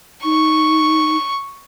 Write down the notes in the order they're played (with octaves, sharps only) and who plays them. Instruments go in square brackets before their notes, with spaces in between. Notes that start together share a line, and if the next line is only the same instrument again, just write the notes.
[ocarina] D#4 [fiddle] C#6